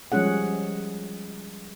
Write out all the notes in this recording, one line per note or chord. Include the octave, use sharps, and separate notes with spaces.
F3 G3 G#3 C#4 G#4 F#5